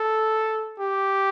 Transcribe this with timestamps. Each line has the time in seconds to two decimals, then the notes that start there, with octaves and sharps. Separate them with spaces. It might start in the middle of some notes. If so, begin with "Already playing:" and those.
Already playing: A4
0.80 G4